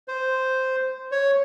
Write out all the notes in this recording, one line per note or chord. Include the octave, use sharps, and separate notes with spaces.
C5
C#5